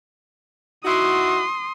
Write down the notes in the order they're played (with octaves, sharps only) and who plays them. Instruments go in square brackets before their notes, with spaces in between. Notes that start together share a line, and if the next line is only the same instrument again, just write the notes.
[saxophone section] D#4 E4 F#4 [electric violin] C6 D#6